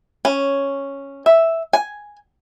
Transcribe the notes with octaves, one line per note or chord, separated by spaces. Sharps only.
C#4
E5
G#5